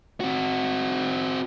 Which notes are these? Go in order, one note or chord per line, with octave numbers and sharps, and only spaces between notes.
C4 F#4